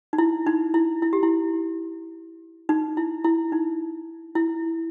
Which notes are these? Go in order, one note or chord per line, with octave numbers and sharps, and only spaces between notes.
D#4
E4
D#4
E4
E4
G4
E4
D#4
E4
E4
D#4
E4